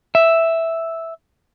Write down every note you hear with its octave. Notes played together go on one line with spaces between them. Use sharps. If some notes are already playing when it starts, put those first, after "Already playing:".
E5